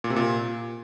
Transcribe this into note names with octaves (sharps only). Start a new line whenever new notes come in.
A#2
C3
A#2